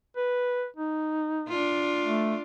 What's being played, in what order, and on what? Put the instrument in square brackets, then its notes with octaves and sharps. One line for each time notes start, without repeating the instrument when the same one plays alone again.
[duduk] B4
D#4
[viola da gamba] D4 F4
[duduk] A3